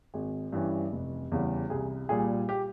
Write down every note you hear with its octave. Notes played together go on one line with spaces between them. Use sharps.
G#1 G#4
G2 E3 G3 C#4
F1
E2 C#3 G3
C2 G#4
A#2 G3 G#4
G4